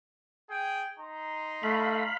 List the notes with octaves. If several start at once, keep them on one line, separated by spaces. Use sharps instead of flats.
G#4 G5
D#4 A#5 C6
A3 F5 B5